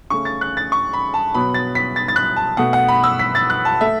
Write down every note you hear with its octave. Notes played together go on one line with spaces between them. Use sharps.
C#3 A3 C#6
A6
F#6
A6
C#6
B5
A5
B2 F#3 B3 B5
A6
B6
A6
A6
F#6
A5
B2 A3 F#5
F#5
B5
E6
B6
A6
F#6
A5
A3 E5